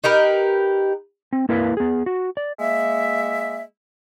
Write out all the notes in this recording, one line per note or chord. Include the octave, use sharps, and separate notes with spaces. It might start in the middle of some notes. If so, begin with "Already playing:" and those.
D#4 G4 A#4 B4
C4
A#3 E4 A#4 B4 E5 F5
B3 G#4
F#4
D5
G#3 A#3 E5